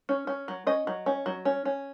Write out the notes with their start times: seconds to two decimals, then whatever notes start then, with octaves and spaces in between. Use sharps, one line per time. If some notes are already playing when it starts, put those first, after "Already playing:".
0.09 C#4
0.27 C#4
0.48 F#3
0.67 C#4 D#5
0.87 F#3
1.06 C#4
1.26 F#3
1.45 C#4
1.65 C#4